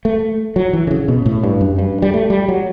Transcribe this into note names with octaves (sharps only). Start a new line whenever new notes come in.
A3
F#3
E3
D3
C#3
B2
A2
G2
F#2
G2
G3
A3
G3
F#3